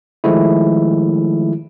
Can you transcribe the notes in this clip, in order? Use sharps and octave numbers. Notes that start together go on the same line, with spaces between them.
D#3 F3 G#3 A3 E4